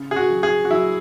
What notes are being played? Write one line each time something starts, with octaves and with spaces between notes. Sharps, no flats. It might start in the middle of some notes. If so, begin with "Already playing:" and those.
Already playing: C#3
G#4
F#4
F#3
G#4
F#4
F#3 E4